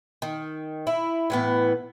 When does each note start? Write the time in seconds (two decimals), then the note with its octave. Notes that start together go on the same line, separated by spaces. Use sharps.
0.22 D#3
0.87 E4
1.30 A2 E3 B3